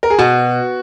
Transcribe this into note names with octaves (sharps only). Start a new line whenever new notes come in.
A#4
G#4
B2 F#4